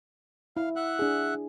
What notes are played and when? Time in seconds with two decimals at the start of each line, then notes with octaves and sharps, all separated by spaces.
0.57 E4 F5
0.76 E5 F#5 F#6
0.99 D4 G#4